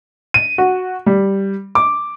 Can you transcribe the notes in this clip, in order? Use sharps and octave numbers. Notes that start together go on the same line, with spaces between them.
D#7
F#4
G3
D6